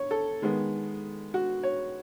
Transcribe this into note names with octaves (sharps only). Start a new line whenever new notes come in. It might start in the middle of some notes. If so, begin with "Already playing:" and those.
Already playing: C#5
A4
D#3 G#3 B3
F#4
C#5